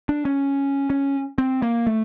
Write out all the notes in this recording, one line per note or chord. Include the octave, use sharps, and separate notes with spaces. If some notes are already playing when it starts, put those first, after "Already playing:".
D4
C#4
C#4
C4
A#3
A3